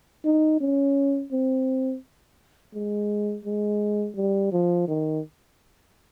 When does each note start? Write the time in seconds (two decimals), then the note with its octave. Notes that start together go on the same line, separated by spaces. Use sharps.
0.25 D#4
0.60 C#4
1.32 C4
2.74 G#3
3.45 G#3
4.16 G3
4.52 F3
4.88 D#3